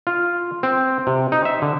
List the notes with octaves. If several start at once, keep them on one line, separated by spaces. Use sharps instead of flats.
F4
C4
C3
D#4
E5
D3